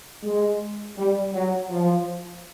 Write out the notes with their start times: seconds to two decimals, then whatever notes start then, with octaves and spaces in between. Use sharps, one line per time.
0.23 G#3
0.96 G3
1.33 F#3
1.70 F3